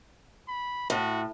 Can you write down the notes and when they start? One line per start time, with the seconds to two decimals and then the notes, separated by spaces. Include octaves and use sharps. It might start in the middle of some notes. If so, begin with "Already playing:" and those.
0.48 B5
0.90 A2 F#4